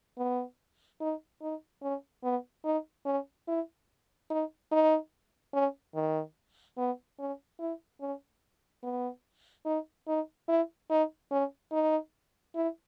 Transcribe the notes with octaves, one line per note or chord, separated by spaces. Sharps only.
B3
D#4
D#4
C#4
B3
D#4
C#4
E4
D#4
D#4
C#4
D#3
B3
C#4
E4
C#4
B3
D#4
D#4
E4
D#4
C#4
D#4
E4